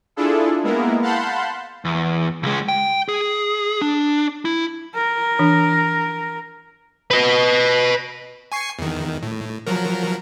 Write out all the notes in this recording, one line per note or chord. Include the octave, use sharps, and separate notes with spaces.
D4 E4 F4 G#4 A4
G#3 A#3 B3 E4 A#4
F5 F#5 A5 B5 C6 G6
E2
C#2 G#3
G5
G#4
D4
E4
A#4
E3 D4
B4 D#5
G#5 C#6 C7
E2 D#3
A2
F3 F#3 A#4